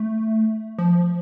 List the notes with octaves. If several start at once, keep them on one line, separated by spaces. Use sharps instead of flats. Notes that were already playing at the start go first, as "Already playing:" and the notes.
Already playing: A3
F3